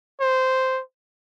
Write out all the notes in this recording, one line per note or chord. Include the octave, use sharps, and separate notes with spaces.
C5